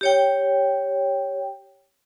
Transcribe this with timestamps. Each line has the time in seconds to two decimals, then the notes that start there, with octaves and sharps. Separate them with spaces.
0.01 G4 C#5 G5